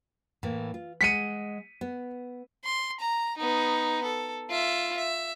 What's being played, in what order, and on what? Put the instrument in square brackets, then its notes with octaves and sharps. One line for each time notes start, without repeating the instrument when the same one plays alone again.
[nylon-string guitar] A2 E3 A#3
F4
[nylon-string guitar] G#3 F#5 [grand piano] B6 C#7 D#7
[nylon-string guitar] B3
[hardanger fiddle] C6
A#5
B3 D#4
A4
F4 E5
E5